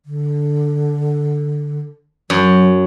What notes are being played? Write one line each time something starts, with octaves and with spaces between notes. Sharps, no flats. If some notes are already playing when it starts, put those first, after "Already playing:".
D3
F#2 F#3